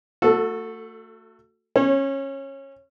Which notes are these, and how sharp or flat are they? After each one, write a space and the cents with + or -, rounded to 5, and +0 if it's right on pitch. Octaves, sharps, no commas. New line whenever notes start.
A3 +30 F#4 -15 A4 +0
C#4 -20 C#5 -35